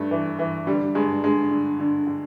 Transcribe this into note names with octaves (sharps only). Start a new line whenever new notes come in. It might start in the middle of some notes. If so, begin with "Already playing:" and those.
Already playing: G2 A3
E3
E3
D3 G3
G2 G#3
D3 G#3
D3
D3
D3